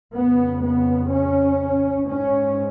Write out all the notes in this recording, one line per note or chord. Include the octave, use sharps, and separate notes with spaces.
F2 C#3 B3
B3
C#4
G#2 C#4